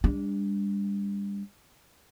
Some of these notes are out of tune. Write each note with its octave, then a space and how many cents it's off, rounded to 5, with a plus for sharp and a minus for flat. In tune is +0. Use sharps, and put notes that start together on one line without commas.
G3 +40 D4 -15